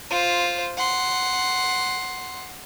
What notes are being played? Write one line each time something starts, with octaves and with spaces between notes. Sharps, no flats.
F4 C5
F#5 C6